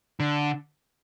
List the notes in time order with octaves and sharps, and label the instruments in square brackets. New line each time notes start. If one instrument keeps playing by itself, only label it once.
[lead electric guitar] D3